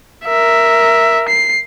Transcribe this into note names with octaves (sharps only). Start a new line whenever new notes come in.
A#4 E5
C7